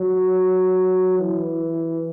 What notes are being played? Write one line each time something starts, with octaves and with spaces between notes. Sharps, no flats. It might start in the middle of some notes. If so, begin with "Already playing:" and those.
Already playing: F#3
E3